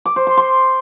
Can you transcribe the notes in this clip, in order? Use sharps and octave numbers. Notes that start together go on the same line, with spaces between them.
D6
C5
C6
C6